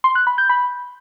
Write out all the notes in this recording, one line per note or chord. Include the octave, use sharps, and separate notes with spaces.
C6
F#6
B5
G6
B5